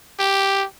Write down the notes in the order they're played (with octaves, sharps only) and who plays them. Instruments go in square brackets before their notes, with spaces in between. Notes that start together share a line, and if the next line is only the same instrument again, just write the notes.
[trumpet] G4